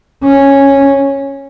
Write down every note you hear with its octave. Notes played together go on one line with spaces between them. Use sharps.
C#4